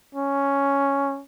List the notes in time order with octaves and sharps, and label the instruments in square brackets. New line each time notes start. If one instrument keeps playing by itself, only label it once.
[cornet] C#4